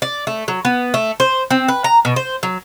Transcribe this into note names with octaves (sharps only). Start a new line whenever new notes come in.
D5
A3
F#3
B3
A3
C5
C4
B4
A#5
B2
C5
F#3